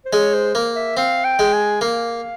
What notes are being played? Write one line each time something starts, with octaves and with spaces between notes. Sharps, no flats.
C5
G#3 C#5
C5
A#3
E5
C4 F5
G5
G#3
G#5
A#3 F5